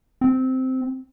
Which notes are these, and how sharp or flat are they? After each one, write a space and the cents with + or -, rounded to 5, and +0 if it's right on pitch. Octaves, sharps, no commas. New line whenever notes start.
C4 -10